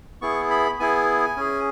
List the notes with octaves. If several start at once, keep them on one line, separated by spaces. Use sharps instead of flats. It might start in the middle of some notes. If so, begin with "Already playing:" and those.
B3 E4 G#4 C#6
B5
B3 E4 G#4 G#5
C#4 G#4